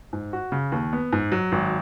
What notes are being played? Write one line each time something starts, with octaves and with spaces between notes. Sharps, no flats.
G#2
F#4
C#3
D#2
B3
G#2
F#3
G#1